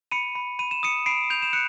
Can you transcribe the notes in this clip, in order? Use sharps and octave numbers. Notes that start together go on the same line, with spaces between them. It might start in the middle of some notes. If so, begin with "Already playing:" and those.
B5 C#7 D#7
B5
B5 D#7
E7
D#6 C#7 D#7
B5 C7 D7
G6 F7
E7
F#6 C#7